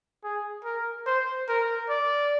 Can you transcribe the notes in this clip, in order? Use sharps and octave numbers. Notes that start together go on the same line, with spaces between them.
G#4
A#4
C5
A#4
D5